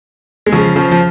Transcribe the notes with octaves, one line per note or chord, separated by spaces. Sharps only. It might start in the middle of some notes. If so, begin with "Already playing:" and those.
G#3
C#3 F3
C#3 F3
F3